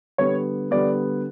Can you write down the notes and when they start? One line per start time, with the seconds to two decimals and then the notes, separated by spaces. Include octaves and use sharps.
0.18 D3 G3 B3 C#5
0.71 D3 G3 B3 D5